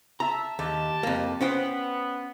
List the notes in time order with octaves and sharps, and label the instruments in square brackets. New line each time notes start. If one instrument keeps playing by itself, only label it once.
[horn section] E5 A5 [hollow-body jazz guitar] A#5
[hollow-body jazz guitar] D#2 [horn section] G4 A5
[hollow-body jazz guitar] F2 A#3
[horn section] B3 [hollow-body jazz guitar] C#4 C5 G5